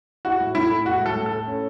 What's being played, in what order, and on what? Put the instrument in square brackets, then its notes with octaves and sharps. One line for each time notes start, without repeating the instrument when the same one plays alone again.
[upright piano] E4 [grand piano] F#4
[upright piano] A2
[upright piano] A2 [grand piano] E4
[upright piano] A3
[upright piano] E4 [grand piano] F#4
[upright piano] A2
[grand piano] A4
[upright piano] A2
[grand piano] A4
[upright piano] A3
C#4